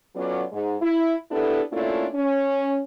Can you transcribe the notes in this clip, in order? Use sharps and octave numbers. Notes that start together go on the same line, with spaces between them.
F#3 B3 C#4 F4 A4 D5
G#2
E4
B3 D4 E4 G4 A4
A3 A#3 C#4 D4 E4 F4
C#4